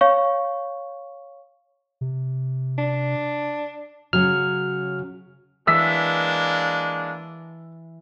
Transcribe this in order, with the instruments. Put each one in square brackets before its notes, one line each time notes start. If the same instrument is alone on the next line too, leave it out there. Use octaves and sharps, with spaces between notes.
[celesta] C#5 F5 C#6
[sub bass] C3
[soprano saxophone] D4
[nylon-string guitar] C#3 F#3 [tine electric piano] F6
[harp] E3 [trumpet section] G#3 A#3 D4 [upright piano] E6 B6